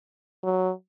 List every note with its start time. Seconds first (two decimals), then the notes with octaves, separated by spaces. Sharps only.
0.44 F#3